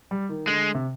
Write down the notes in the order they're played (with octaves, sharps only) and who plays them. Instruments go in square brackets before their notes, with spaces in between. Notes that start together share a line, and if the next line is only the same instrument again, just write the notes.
[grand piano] G3
D#3
[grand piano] D3 [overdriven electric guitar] G#3
[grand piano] C3